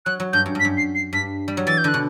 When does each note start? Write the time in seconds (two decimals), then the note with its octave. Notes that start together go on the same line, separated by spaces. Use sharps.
0.05 F#3 F#6
0.20 F#3
0.33 G2 G6
0.46 F#2
0.55 G2 B6
0.65 F#2
0.77 C7
0.95 C7
1.13 G2 B6
1.48 G3
1.57 F#3
1.67 E3 A6
1.78 G6
1.84 D3 F#6
1.94 B2